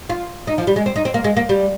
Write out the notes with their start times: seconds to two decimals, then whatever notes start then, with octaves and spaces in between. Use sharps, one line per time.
0.10 F4
0.47 D#4
0.58 F3
0.67 G3
0.76 G#3
0.86 C4
0.96 D#4
1.05 C4
1.14 A#3
1.24 G#3
1.37 A#3
1.49 G3